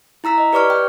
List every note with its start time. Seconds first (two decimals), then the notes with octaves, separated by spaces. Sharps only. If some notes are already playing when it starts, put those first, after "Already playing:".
0.24 E4 A#5 E6 B6
0.38 D#5
0.53 G4 B4 D5 C#6 D6 F6
0.70 G5